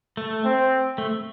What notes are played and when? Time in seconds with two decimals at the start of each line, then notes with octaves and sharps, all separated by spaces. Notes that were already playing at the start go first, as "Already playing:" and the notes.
0.17 A3
0.45 C4
0.98 A3